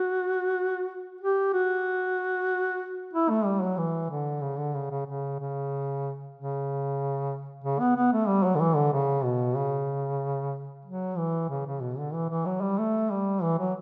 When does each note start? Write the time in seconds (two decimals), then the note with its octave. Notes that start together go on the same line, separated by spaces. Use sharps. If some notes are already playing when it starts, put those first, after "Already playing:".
Already playing: F#4
1.21 G4
1.54 F#4
3.14 E4
3.30 A3
3.45 G3
3.62 F#3
3.78 E3
4.10 D3
4.42 C#3
4.58 D3
4.74 C#3
4.91 C#3
5.06 C#3
5.39 C#3
6.35 C#3
7.64 C#3
7.80 B3
7.96 B3
8.12 A3
8.28 G3
8.44 F#3
8.55 D3
8.60 E3
8.76 D3
8.93 C#3
9.24 B2
9.56 C#3
10.85 F#3
11.17 E3
11.49 C#3
11.66 C#3
11.81 B2
11.98 D3
12.14 E3
12.30 E3
12.46 F#3
12.61 G3
12.78 A3
13.11 G3
13.43 E3
13.59 F#3